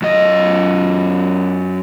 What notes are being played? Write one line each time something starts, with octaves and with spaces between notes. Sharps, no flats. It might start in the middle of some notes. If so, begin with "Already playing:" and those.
F#2 D#5